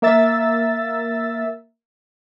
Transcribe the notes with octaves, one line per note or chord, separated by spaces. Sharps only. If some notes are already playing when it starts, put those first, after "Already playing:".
A#3 A#4 E5 E6 A6